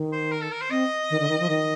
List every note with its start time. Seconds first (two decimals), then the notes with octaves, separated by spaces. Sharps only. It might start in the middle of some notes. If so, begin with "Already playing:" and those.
Already playing: D#3
0.12 C5
0.31 A#4
0.41 A4
0.51 A#4
0.61 C5
0.70 C4 D#5
1.10 D#3
1.20 D3
1.29 D#3
1.40 F3
1.49 D#3 D#5